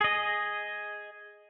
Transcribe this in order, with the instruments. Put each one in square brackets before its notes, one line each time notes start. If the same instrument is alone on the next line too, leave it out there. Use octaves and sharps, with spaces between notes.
[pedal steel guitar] G#4 D#5